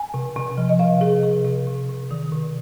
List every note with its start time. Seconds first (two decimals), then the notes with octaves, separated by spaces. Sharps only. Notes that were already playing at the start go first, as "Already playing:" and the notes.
Already playing: G#5
0.14 C3
0.36 C3
0.58 F3
0.69 D#5
0.79 C3 F5
1.01 C3 G#4
1.24 C3
1.45 C3
1.67 C3
1.89 C3
2.11 D#3
2.32 C3